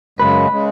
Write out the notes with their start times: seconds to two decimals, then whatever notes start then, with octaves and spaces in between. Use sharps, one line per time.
0.19 F#2 C#3 G#3 B4
0.51 C#3 G#3